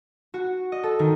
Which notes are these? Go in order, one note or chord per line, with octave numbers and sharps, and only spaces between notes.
F#4
D#5
A4
D#3